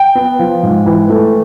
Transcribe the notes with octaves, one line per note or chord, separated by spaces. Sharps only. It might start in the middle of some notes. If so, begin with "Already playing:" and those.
Already playing: G5
B3
F3
G#2
E3
A3